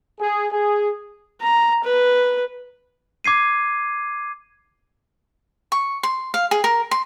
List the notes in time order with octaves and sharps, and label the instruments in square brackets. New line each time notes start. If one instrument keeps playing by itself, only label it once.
[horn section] G#4
G#4
[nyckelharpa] A#5
B4
[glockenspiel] D6 G#6 C7 D#7
[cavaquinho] C#6
C6
F5
G#4
A#4
C6